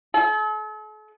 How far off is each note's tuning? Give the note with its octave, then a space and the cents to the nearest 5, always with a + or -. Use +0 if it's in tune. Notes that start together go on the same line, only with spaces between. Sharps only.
A4 -45